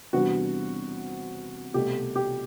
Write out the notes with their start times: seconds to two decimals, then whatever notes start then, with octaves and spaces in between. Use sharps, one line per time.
0.13 E2 C3 G3 B3 D4 F#4
1.74 C2 B2 A3 G4
2.16 G4